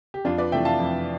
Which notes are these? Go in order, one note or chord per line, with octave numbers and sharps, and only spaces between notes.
G4
F2 D4 F4
B4 D5
C3 E3 A3 E5 G5
F5 A5
F2